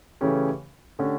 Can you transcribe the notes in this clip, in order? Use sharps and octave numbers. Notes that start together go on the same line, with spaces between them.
C#3 E3 A3 C#4 G4
D3 A3 C#4 G4